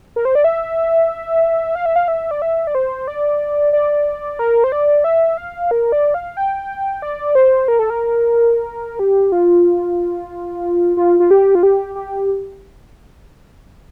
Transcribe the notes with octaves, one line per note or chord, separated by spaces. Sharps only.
A#4
C5
D5
E5
F5
E5
F5
E5
D5
E5
D5
C5
D5
D5
A#4
C5
D5
E5
F5
A#4
D5
F5
G5
D5
C5
A#4
A4
A#4
G4
F4
F4
F4
G4
F4
G4
G4